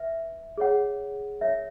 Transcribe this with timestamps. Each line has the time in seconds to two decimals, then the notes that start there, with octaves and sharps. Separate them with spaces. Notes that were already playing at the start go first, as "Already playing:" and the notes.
Already playing: B4 E5
0.58 G#4 C#5 F#5
1.41 A#4 C#5 E5